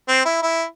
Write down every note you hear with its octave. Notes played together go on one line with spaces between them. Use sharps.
C4
E4
E4